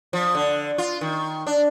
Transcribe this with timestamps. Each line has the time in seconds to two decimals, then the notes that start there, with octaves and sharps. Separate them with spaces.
0.13 F3
0.35 D3
0.78 F4
1.01 D#3
1.47 D4